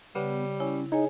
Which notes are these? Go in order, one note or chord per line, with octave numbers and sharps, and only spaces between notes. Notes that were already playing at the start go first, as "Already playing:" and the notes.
C#3 G3 B3
C#4 E4
D#4 G#4 C#5 G#5